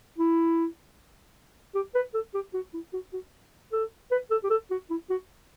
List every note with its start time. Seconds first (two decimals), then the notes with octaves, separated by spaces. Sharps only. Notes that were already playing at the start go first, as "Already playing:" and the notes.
0.18 E4
1.75 G4
1.95 B4
2.14 A4
2.34 G4
2.54 F#4
2.74 E4
2.93 F#4
3.13 F#4
3.72 A4
4.11 B4
4.31 A4
4.44 G4
4.50 A4
4.71 F#4
4.90 E4
5.10 F#4